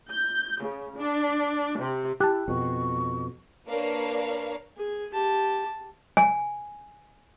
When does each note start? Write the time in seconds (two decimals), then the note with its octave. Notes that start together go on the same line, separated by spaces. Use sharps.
0.10 G6
0.62 C#3
0.96 D4
1.79 C3
2.20 E4 G4 G5 A5 F#6
2.48 F2 B2 C#6
3.67 A#3 D4 A#4 B4 C#5 F5
4.77 G#4
5.13 G4 A5
6.17 G#5